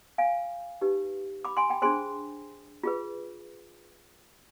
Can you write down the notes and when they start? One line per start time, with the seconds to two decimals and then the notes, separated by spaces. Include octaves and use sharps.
0.18 F5 G#5
0.81 D#4 G4 B4
1.45 B5 D6
1.57 G#5 C6
1.69 G5 B5
1.82 D4 G#4 C5 G#5 C6
2.84 F4 G#4 B4